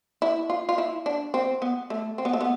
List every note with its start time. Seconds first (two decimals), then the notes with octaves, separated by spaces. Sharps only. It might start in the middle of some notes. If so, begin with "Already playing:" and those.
0.22 E4
0.50 F4
0.69 F4
0.78 E4
1.06 D4
1.34 C4
1.62 B3
1.90 A3
2.18 C4
2.25 B3
2.33 A3
2.41 B3